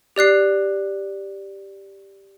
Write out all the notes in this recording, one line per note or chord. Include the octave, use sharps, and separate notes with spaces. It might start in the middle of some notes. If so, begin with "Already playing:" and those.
G4 D5 F#6 C7